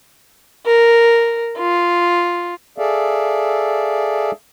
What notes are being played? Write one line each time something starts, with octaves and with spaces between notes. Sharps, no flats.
A#4
F4
G#4 A4 D5 E5 F5